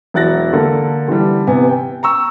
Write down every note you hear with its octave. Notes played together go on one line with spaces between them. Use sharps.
E1 F#3 E4 F#6 A6 A#6
D3 A#3 A4
D3 E3 G3
C3 B3 G#5
G5
A#5 C#6 E6